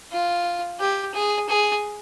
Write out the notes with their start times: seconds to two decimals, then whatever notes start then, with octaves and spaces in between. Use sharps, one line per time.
0.12 F4
0.80 G4
1.14 G#4
1.49 G#4